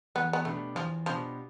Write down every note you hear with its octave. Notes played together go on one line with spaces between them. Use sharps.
E2 B3
B3
B2 A3 B3 D4 G4
E2 F3
B2 F3 B3 D4 G4